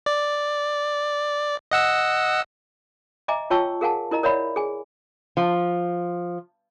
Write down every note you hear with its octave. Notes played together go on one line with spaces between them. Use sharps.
D5
D#5 F#5 E6
D#5 E5 G#5 A#5 D6
F4 C#5 G5 A5 C#6 E6
G#4 A#4 F5 F#5 G#5 A5
E4 A#4 D#5 A#5
A#4 C#5 D5 E5 F#5 B5
G#4 G#5
F3